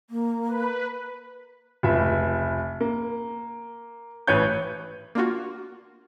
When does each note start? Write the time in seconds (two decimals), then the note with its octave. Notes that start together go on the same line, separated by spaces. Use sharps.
0.10 A#3
0.48 B4
1.83 F1 C#2 E5
2.81 A#3
4.27 A1 B4 C#5 G6
5.15 A#3 D4 F4 F#4